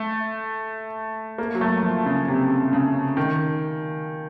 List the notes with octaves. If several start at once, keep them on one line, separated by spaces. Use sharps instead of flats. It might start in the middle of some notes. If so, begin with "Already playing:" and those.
Already playing: A3
A#3
F#3
A3
F3
C#3
C3
C#3
D#3